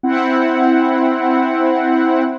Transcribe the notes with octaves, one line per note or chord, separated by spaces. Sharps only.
C4 E4 F#5